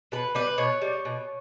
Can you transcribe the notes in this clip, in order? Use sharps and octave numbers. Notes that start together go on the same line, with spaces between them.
B2 B4
G3 B4
B2 C#5
G3
B2